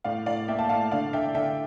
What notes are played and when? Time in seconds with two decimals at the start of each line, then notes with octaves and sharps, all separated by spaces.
0.04 A2 D5 F5
0.26 A2 D5 F5
0.48 A#3 E5 G5
0.58 F5 A5
0.69 A2 F5 A5
0.91 D3 D5 F5
1.13 D3 E5 G5
1.35 D3 E5 G5